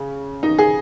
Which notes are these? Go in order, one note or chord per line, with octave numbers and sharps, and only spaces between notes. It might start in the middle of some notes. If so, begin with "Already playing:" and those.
Already playing: C#3
D#4
G#4